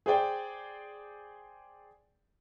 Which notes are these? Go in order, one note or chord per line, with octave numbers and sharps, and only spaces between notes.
G#4 C5 D5 G5